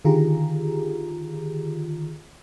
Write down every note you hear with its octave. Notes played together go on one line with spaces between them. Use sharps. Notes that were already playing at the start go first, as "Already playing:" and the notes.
D3 D#3 F4 G4 G#4 A#5